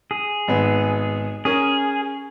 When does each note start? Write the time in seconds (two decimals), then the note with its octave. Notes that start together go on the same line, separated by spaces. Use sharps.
0.11 G#4
0.48 G#1 B3
1.45 C#4 G#4 A#4